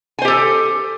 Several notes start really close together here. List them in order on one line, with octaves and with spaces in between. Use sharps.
G#5 C5 G4 A4